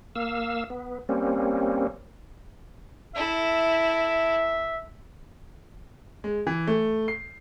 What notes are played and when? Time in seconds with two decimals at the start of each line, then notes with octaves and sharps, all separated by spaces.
0.15 A#3 F5 E6
0.70 B3
1.09 G3 A#3 C4 C#4
3.16 E4 A4 E5
6.24 G#3
6.47 E3
6.67 A3
7.08 C7